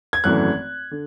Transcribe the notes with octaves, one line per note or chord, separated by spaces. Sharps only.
G#6
G#1 F#2 E3 A3 F#6
D3